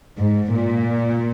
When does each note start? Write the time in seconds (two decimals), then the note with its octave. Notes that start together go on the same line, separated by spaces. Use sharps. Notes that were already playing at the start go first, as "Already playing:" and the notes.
0.19 G#2
0.53 A#2